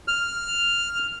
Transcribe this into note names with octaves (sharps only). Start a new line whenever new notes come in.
F6